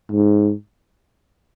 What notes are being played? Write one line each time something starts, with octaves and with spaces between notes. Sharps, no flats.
G#2